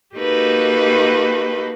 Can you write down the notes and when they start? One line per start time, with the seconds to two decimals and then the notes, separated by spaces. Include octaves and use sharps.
0.16 A#3 D#4 F#4 G4 A4 B4